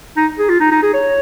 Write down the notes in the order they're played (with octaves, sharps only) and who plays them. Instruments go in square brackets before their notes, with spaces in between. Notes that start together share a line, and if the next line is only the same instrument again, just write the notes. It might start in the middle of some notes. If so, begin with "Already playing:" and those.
[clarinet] D#4
G#4
F4
D#4
D#4
G#4
C#5